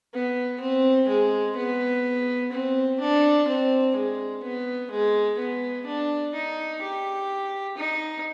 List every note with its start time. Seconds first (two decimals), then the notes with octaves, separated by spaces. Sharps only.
0.14 B3
0.60 C4
1.08 G#3
1.56 B3
2.52 C4
3.00 D4
3.48 C4
3.95 G#3
4.43 B3
4.91 G#3
5.39 B3
5.86 D4
6.34 D#4
6.81 G4
7.77 D#4